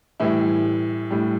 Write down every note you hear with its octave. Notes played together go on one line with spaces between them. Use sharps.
A2 E3 G3 E4
A2 G3